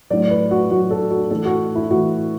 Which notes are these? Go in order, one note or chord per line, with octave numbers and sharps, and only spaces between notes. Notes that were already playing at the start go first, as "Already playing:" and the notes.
A2 F#3 D5
B4
F#4
A2 F#3 F#4
A4
F#4
A2 E3 A4
F#4
E4
A2 E3 F#4